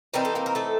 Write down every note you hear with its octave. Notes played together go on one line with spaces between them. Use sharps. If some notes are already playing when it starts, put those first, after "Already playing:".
E3 G3 C4 D#4 A#4
A4
A#3 A#4
A#4
A3 A4